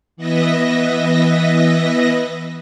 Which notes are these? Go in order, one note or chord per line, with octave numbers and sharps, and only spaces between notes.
E3 B3 B4 D#5 E5 A#6